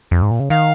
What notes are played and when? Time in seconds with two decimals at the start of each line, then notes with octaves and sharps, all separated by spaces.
0.11 F2
0.22 G#2
0.31 A#2
0.40 C#3
0.50 D#3 F5